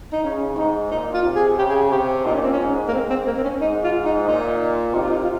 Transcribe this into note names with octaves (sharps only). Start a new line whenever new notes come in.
D#4
C#3 C#4
G#2 D#4
A#2 D#4
F4
C3
G#4
C#3 G4
G#4
G4
C3 G4
A#2 D#4
C#4
C4
C#4
G#2
A#3
G#2 C4
C4
A#3
C4
C#4
G#2 D#4
F4
D#4
A#2 D#4
C3 D#4
F4
D#4
F4